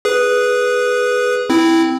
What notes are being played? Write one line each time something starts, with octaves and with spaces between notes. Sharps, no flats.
G#4 B4
C4 E4